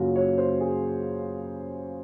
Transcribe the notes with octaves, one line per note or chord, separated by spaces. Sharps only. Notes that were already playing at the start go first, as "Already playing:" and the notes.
Already playing: F#2 C#3 F#3 A#3 C#4 F4 F#4
C#5
C5
G#4